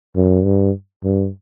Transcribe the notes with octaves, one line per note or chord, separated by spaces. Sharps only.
F#2
G2
G2